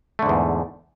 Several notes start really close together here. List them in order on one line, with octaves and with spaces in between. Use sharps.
A3 D3 G#2 E2